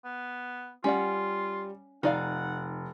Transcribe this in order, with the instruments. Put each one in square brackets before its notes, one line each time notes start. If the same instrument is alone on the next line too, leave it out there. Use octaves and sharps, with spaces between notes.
[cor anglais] B3
[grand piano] G3 [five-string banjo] C#4 D5 F#5 [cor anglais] F4
[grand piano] F1 [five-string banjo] D#4 D5 F5 [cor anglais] F#5